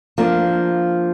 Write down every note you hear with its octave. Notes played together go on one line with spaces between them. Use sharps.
F3 A#3 D4